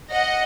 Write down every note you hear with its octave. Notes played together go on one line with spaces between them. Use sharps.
D#5 F#5